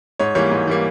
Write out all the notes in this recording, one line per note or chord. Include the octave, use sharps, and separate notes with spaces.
G#2 C#5
E3 G3 A#3 C#5
G#2
E3 G3 A#3